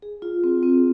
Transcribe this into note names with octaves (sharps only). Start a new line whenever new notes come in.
G#4
F4
C4
C4